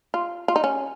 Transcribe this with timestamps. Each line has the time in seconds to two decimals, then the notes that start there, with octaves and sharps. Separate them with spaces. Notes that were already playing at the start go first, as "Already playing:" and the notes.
0.14 F4
0.48 F4
0.56 D#4
0.64 C#4